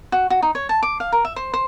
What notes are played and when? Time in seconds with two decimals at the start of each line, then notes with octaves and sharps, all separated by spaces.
0.12 F#4
0.30 F#4
0.42 D#4
0.55 C#5
0.69 A5
0.83 D6
1.00 F5
1.12 A#4
1.25 E5
1.36 C5
1.54 C5